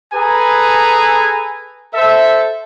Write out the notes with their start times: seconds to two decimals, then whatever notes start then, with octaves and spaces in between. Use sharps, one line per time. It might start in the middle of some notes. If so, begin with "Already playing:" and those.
0.13 G#4 A4 B4 G#5 A#5
1.94 A4 C5 E5